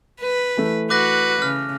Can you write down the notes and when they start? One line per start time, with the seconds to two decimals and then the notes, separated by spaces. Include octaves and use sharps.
0.21 B4
0.57 E3 A3
0.90 F#4 B4 D6 F#6 A#6
1.42 C#3 F6